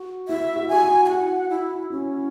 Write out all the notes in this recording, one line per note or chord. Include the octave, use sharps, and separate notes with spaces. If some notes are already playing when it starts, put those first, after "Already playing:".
Already playing: F#4
E4 E5
F#4
F#4 G#5
E4
G#5
F#4 F#5
E4
C#4 E4